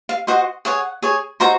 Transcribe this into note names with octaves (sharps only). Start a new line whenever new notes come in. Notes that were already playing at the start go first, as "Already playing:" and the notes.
F5
F#4 C5 D#5 F#5
G#4 C#5 F#5
G#4 C#5
D#4 F#4 C5 A#5